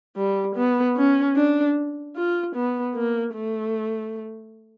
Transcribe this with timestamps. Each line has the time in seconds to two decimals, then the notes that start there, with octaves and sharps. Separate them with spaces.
0.16 G3
0.56 B3
0.96 C#4
1.36 D4
2.16 F4
2.55 B3
2.95 A#3
3.35 A3